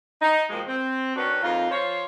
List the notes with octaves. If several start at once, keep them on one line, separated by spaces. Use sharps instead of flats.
D#4
B2 D#3 F3 G#3 A#3
C4
D#3 C#4 D4 F#4 B4
F2 A#3 D#4 F4
F3 F4 C5 C#5